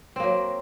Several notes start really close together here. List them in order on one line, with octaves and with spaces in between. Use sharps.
C4 A#3 F#3